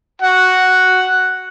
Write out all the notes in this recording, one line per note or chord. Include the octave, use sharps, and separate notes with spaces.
F#4 F#5